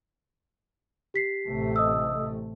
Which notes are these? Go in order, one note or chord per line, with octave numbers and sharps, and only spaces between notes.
G4 B6 C7
A1 C3 A3
D#5 D#6 E6